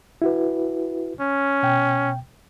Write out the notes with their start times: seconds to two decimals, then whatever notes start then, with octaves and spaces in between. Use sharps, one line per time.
0.22 E4 F#4 B4
1.21 C#4
1.63 B2 G5